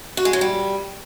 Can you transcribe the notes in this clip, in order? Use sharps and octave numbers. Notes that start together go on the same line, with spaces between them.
F#4
G#3
F#3
G3